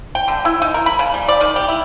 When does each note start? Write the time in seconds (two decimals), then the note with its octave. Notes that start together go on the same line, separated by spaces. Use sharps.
0.15 G5
0.28 D3
0.45 E4
0.62 D#4
0.74 A#4
0.86 B5
0.99 C#3
1.14 G3
1.28 D5
1.41 D#3
1.56 G4
1.68 E4